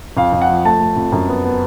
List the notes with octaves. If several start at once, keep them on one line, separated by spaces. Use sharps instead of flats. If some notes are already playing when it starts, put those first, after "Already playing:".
F2 F5
F2
F#5
F3
A3 A5
A3
F2
F#2
B3
B3